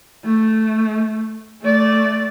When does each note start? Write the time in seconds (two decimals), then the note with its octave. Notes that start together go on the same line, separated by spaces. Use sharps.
0.24 A3
1.62 A3 D5